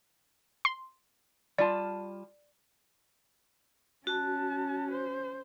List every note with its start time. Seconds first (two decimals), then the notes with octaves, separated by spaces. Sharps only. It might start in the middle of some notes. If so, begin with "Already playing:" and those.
0.65 C6
1.58 G3 F4 D5 A5
4.07 C#4 F#4 A5
4.91 C5